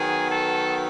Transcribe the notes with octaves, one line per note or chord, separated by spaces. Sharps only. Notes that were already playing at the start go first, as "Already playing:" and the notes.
Already playing: D#3 F#3 B3 G#4
A4